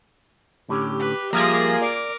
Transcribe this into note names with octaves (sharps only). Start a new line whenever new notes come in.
A2 D3 C#4 G4
B4
F3 G3 A#3 F4 G#4 E5 A#6
A#4 D5 D6